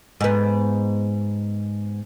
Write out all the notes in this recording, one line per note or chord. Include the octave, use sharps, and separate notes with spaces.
G#2 B3